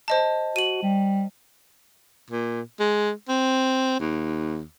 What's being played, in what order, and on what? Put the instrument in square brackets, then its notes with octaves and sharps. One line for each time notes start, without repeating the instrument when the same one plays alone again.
[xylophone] C5 D#5 A5
[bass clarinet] F#4 [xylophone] D#7 F#7
[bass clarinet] G3
[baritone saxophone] A#2
G#3
C4
D#2